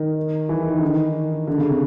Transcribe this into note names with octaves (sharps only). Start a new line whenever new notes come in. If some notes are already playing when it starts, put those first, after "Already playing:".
Already playing: D#3
E3
D#3
D#3
D3
D#3
D3
C#3
C3